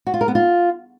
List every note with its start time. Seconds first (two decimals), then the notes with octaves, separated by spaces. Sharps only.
0.07 F#4
0.14 F4
0.21 A#4
0.28 B3
0.35 F4